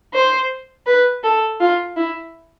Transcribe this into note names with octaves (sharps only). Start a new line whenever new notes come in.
C5
B4
A4
F4
E4